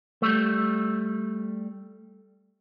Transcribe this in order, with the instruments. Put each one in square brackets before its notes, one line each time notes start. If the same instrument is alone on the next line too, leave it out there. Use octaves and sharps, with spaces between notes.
[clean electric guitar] G3 A3